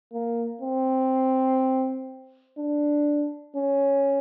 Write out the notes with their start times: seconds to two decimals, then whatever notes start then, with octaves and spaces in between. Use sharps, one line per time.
0.13 A#3
0.62 C4
2.58 D4
3.56 C#4